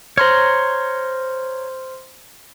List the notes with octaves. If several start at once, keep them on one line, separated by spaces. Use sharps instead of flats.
C5 C#5 A#5 C6 F6